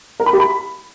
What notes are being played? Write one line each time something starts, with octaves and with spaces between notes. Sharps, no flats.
A#4
B5
G4
B5